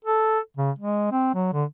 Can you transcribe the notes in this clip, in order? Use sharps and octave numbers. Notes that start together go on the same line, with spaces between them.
A4
C#3
G#3
C4
F#3
D3